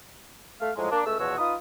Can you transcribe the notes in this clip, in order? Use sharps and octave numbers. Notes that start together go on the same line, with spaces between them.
A3 F5
A2 F3 F#3 G#3
A#3 D4
C#2 A3 C#4 E6
E2 B2 F3 F#4 C#5 E6
D#4 F4 B4 D#6